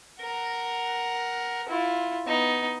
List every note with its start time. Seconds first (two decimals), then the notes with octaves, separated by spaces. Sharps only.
0.21 A#4 F#5
1.69 E4 F4
2.27 B3 D#4